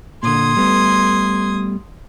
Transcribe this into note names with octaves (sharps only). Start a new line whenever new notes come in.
A#2 D3 C6 D#6 G#6
G3 A3 B3